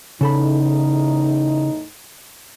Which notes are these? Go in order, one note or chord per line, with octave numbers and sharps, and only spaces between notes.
E2 A2 C#3 D#4 A4 B5